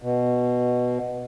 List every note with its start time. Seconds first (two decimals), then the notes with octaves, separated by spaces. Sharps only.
0.02 B2